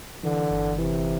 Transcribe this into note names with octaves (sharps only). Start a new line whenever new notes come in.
D3 E3
G1
C3 E3